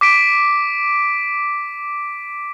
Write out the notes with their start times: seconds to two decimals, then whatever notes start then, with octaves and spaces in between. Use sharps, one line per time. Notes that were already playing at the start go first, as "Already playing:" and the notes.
0.01 D6 B6 D7